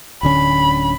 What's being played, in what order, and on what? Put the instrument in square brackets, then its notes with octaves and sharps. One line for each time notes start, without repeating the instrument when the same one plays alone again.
[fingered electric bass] D1 D3 C#4 [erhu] B5